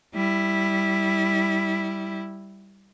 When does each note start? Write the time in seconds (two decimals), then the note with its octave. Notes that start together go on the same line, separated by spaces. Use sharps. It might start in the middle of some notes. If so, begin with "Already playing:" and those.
0.14 G3 E4